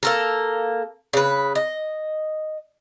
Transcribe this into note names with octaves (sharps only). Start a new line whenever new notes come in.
A#3 A4 A#4
C#3 B4
D#5